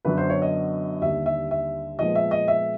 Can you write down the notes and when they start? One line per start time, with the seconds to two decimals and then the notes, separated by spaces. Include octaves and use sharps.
0.05 F#2 D3 F#3 B3 B4
0.17 C5
0.30 C#5
0.42 D#5
1.01 D#2 D3 G3 E5
1.26 E5
1.51 E5
1.99 A#2 F3 G#3 B3 D#5
2.15 E5
2.31 D#5
2.48 E5